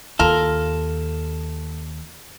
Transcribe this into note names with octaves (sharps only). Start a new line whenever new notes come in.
D#2 F4 A4 A#4